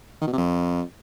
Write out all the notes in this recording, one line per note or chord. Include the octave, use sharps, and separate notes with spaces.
D#3
B2
C3
F2